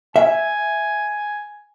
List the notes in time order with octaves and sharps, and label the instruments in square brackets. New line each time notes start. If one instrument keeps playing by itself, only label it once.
[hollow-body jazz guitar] E5 [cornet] G#5